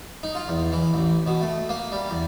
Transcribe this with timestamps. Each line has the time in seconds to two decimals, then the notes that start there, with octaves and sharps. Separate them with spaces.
0.23 D#4
0.35 F4
0.48 E2
0.72 E3
0.94 A1
1.27 B2
1.41 A3
1.69 A#3
1.92 G3
2.10 E2